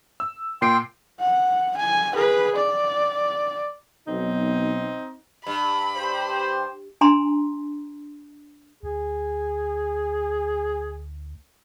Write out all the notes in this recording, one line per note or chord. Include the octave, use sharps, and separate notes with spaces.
E6
A#2 G5 C6 C7 D7
F#5
G#5
G#4 B4
D5
B1 C4 D#4
G2 B5
G4 C5
D4 G#5 A#5 C6
D2 G#4